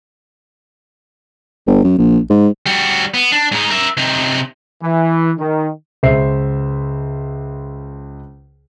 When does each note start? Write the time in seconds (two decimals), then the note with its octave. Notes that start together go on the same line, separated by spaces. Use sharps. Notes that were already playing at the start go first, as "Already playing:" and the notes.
1.67 G1
1.84 F#2
1.98 A#1
2.30 G#2
2.66 G3 F#4
3.14 B3
3.32 D4
3.52 G#2 D#4
3.71 A#4 E5
3.97 C3 D#4
4.83 E3
5.39 D#3
6.03 C#2 C5 E5 C7